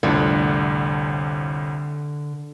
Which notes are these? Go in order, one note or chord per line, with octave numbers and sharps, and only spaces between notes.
C2 F2 A2 D3